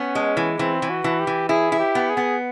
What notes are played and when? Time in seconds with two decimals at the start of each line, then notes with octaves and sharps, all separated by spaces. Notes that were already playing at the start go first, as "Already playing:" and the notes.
Already playing: B3 C#4
0.15 G#3
0.37 E3
0.59 E3 C4
0.82 E3
0.89 F#4
1.04 E3
1.20 G4
1.27 E3
1.49 E4 G#4
1.72 E4
1.80 G4
1.95 B3
2.10 G#4
2.17 B3